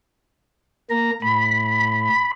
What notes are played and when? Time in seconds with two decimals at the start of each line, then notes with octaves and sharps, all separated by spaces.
0.90 A#3 A#5
1.22 A2 B5